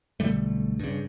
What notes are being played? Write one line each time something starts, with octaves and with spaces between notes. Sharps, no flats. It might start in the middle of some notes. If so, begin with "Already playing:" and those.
B1 D3 G3 A3
G2 C#3